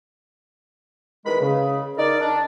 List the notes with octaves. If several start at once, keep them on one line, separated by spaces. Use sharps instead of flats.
E2 D#3 G#3 B4 B5
C#3
D#4 A#4 D5
D4